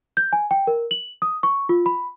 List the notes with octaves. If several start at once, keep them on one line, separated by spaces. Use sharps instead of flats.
G6
G#5
G5
A#4
F#7
D#6
C#6
F4
B5